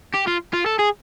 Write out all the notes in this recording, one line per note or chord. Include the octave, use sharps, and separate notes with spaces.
G4
F4
F4
A4
G#4